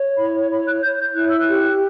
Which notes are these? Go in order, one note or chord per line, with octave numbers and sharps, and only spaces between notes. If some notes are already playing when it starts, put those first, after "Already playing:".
Already playing: C#5
E4 B5
C#5 B5
F#6
C#5 G6
G6
E4 F#6
E6
F#6
G4